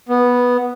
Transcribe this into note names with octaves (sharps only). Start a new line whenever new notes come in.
B3